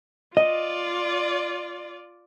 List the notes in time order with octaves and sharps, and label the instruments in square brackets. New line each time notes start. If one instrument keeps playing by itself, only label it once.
[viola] F4 D5 [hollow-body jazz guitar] D#5